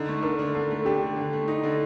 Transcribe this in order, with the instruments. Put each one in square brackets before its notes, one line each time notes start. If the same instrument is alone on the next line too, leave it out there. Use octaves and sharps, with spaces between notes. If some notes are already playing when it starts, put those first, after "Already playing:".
Already playing: [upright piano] D3 [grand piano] D#4
[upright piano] A3
[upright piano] D4 [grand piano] A#4
[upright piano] D3
[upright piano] D3 [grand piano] A4
[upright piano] A3
[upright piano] D4 [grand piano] G4
[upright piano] D3
D3
A3
D#4
D3